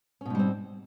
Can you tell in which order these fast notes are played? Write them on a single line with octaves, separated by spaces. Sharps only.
C#4 B2 G#2 G3 C4